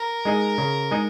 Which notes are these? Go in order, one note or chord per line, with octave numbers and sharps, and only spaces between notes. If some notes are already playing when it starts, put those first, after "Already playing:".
Already playing: A#4
G#3 D#4 G#4 D#5
C#3
G#3 D#4 G#4 D#5